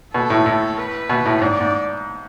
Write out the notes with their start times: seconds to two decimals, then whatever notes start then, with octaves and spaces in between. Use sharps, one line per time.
0.14 B2 A4
0.30 A2
0.46 A2
0.78 B4
1.10 B2
1.25 A2
1.42 G#2 D5
1.60 G#2